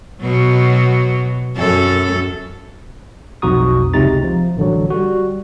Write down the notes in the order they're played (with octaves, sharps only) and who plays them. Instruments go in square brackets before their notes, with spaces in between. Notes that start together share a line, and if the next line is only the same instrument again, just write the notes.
[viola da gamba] B2 F#3
F#2 A4
[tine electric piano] B1 F2 F#4 A#5 C#6 D#6
G1 C#2 C3 D#4 A#5 A6
F3
A1 D3 F#3
G3 F#4